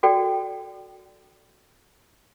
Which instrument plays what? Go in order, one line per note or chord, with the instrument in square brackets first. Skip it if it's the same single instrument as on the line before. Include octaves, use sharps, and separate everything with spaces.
[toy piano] F#4 A4 D5 G5